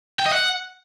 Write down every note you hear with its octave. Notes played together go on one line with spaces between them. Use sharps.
G5
D#5
F#5